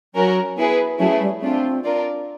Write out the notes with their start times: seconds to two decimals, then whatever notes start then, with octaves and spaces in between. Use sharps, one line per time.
0.14 F#3 C#4 F#4 A#4
0.57 B3 E4 G#4 B4
0.99 F#3 A3 C#4 E4 G#4 B4
1.21 G3
1.41 A3 C4 D4 F4
1.84 D4 F4 A#4 D5